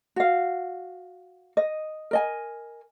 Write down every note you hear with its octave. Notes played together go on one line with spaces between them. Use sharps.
F#4 F5
D#5
A#4 D#5 G#5